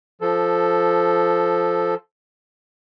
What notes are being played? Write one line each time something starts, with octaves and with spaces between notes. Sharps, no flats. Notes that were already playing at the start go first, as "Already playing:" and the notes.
F3 A4